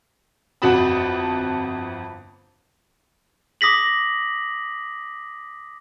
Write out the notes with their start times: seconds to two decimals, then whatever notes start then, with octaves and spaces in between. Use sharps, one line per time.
0.62 G1 F2 F#4 A5 B5 D#6
3.61 D6 D#6 A#6 B6 F#7